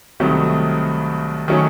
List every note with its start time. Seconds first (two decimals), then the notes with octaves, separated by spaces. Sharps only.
0.20 C2 C3 D#3 F#3 A3
1.48 D#3 F#3 A3 C#4